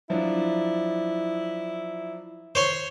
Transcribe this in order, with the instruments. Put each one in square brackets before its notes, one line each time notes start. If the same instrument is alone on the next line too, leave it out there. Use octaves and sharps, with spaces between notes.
[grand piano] F3 F#3 D4 [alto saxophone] E4
[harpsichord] C5 C#5 C6